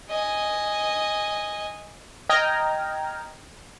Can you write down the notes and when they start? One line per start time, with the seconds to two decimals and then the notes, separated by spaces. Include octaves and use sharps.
0.10 D#5 G#5
2.29 D#5 G5 A#5 F6 G#6 A#6